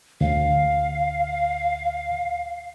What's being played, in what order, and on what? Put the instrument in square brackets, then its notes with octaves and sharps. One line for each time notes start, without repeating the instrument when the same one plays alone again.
[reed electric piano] D2 [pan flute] F5